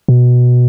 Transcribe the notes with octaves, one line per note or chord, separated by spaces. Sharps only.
B2